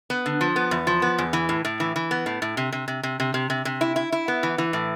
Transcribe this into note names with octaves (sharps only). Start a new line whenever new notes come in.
B3
D3
F3
B3
E2
F3
B3
E2
E3
A2
A2
E3
E3
B3
A2
A2
C3
C3
C3
C3
C3
C3
C3
C3
E4
E4
E4
B3
E3
E3
A2